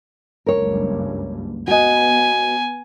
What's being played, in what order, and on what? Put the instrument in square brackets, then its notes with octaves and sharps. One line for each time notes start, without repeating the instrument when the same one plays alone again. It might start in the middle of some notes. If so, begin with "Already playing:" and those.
[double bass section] F#1 C#2 G2 [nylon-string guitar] A#4 C#5
[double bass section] B3 [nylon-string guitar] F#4 D#5 [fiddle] G#5